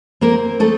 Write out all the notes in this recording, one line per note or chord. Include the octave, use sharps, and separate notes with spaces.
A#3 C4 A#4
A3 D#4 A4